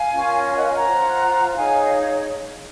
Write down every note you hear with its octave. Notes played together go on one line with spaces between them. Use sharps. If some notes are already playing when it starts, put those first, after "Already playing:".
Already playing: F5 G#5
C#4 F4 A#4 C#5
F5 G#5
D#5 F#5
F5 G#5
F#5 A#5
F4 C5
D#4 G#4 C#5 F5 G#5